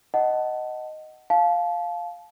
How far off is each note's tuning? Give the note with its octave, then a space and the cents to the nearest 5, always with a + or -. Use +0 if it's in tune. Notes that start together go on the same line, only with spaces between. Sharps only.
D#5 +0 F#5 +15 A5 +0
F5 +5 A5 -30